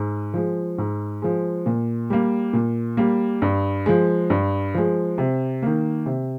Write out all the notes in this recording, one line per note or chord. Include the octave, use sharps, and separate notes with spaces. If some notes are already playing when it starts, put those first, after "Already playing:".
Already playing: G#2
F3 G#3
G#2
F3 G#3
A#2
G3 A#3
A#2
G3 A#3
G2
F3 G#3
G2
F3 G#3
C3
D#3 A#3
C3